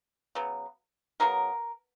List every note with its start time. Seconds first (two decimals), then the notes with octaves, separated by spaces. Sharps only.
0.35 C#3 F#3 B3
1.20 C#3 F#3 B3 A#4